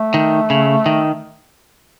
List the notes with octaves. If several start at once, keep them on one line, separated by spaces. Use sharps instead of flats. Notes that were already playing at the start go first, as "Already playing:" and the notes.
Already playing: A3
D#3
C#3
D#3